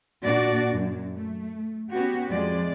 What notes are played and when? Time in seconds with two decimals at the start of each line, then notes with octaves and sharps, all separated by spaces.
0.22 A#2 D4 F#4 D5
0.72 F#2
1.16 A3
1.93 B3 C#4 F#4 G4
2.28 F2 F3 G#3 D5